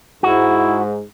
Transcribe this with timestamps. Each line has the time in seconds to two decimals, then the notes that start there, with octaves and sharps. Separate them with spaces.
0.23 G#2 E4 F#4